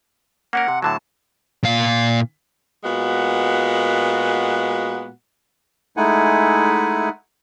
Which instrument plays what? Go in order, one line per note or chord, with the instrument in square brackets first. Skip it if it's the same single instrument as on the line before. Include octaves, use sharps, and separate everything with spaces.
[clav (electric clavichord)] A#3 C#4 A#4 [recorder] F#5
[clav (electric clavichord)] C3
[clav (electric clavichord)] A2 D3 F#3 [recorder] A5
[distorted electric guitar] A#2 F5
[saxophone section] A#2 G#3 B3 F#4 F#5
[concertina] G#3 A3 D#4 E4 F#5 G#5